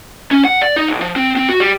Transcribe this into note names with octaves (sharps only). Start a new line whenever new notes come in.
C#4
F#5
D5
D#4
B1
F3
C4
C4
F#4
G3